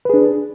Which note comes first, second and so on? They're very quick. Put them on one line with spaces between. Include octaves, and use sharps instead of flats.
B4 G#4 D4